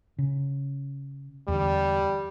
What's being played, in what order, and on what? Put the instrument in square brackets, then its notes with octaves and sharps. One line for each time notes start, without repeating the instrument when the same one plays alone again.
[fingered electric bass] C#3
[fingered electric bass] E2 D3 [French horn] G3